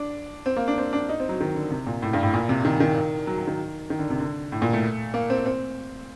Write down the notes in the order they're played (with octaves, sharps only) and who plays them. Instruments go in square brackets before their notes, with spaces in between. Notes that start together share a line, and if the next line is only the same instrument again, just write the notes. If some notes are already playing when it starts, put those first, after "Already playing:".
Already playing: [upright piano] D4
C4
A#3
D4
C4
D4
D#4
C4
F#3
D#3
D3
C3
A#2
A2
G2
A2
A#2
C3
D#3
D#3
F#3
F#3
D#3
D#3
D3
C3
D3
A2
A#2
A3
A#3
C4
C4